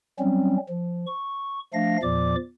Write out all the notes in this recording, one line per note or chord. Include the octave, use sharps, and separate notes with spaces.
F#3 G3 C4 C#4
F3
C#6
F3 A3 D4 F5 A#6
E2 A#2 F3 D5 D6